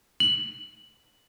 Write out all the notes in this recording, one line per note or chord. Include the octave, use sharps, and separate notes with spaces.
F#7